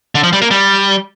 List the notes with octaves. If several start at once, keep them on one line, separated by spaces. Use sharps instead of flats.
D3
F3
G3
A#3
G3